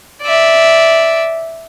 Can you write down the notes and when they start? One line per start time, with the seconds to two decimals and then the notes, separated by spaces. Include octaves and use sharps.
0.22 D5 E5